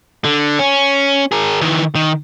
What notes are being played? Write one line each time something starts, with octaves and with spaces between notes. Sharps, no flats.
D3
C#4
G#4 A#4
D#3 E3
D#3